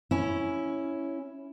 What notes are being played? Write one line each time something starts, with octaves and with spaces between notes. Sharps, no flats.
C#4 E4